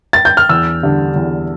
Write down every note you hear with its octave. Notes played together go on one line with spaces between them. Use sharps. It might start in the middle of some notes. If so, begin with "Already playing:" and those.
A6
G6
F6
E2 E6
D3 G3
E2